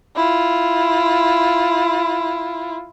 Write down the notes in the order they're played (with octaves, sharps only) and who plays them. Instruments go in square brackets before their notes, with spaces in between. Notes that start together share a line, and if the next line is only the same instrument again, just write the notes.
[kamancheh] E4 F4